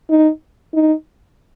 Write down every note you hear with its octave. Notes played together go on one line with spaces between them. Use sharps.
D#4
D#4